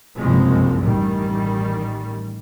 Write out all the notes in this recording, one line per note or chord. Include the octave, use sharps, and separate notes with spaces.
F#1 C2 G2 F3 G#3 C4
A1 D#3 G3